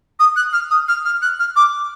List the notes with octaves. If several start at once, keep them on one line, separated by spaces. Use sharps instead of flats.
D#6
F#6
F6
D#6
F6
F6
F#6
F6
D6